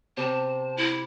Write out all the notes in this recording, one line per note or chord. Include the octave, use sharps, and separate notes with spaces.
C3 A5
E4